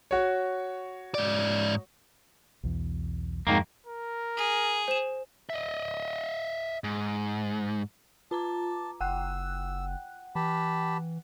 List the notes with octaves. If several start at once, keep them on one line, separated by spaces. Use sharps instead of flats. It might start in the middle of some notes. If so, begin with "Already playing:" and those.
F#4 C#5
G#2 D5
B1 E2
F2 G#2 D#3 A#3
A#4
G#4
C5 E7
D#5 E5
G#2
F4 A5 A#5 D6
F#1 F#5 G5 E6 F#6
E3 G4 A5 B5